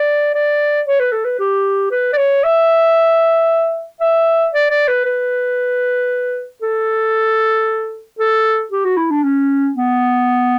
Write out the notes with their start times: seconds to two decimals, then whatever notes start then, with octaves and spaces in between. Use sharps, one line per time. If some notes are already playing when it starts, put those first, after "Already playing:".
Already playing: D5
0.34 D5
0.86 C#5
1.00 B4
1.12 A4
1.25 B4
1.40 G4
1.91 B4
2.13 D5
2.17 C#5
2.44 E5
4.01 E5
4.53 D5
4.70 D5
4.88 B4
5.05 B4
6.62 A4
8.19 A4
8.72 G4
8.85 F#4
8.97 E4
9.11 D4
9.23 C#4
9.76 B3